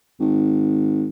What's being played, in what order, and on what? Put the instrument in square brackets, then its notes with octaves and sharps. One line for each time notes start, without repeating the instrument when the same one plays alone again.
[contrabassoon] G#1